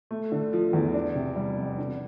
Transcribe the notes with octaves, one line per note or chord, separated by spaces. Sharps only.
A3
D3
F3
E2
D4
C3
G3
F2
D4